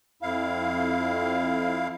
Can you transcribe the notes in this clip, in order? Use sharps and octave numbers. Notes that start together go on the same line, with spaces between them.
F2 E4 F5